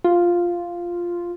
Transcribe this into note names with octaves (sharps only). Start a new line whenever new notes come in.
F4